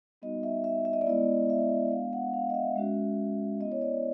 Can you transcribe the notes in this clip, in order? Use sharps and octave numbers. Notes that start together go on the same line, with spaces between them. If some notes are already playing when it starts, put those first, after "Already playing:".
G3 B3 D#4 F#4 D#5
E5
E5
E5
D#5
D5
G#3 B3 E4 D#5
E5
G#3 B3 D4 F5
F#5
F5
D#5
E5
G#3 C#4 F#4
B3 E4 D#5
C#5
D5